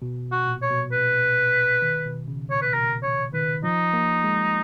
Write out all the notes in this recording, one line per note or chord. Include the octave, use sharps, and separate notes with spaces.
B2
F#4
A#2
C#5
B2
B4
D#3
B2
C#3
A#2 C#5
B4
B2 A#4
C#5
D#3 B4
F3 D#4
A#3
G#3